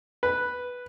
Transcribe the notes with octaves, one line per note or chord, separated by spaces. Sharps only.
B4